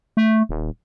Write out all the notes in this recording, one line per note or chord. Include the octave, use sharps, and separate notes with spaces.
A3
D#1